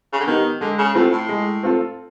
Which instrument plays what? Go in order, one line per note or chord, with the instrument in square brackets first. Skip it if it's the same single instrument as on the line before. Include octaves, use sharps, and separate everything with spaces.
[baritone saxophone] C#3
D3
[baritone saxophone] D#3 [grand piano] B3 D#4 G4
[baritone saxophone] D3 [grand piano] G#3
[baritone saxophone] C#3
[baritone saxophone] A2 [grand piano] C4 F4 A4
[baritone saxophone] A2
[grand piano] G#3
C4 F4 A4